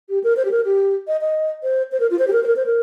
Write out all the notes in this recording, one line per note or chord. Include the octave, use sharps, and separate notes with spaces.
G4
A#4
C5
G4
A#4
G4
D#5
D#5
C5
C5
A#4
F4
C5
G4
A#4
C5
A#4
C5
A#4